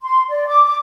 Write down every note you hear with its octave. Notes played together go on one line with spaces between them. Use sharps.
C6
D5
D6
D6